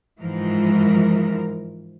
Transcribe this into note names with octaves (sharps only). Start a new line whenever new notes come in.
G#2 E3 F3 A#4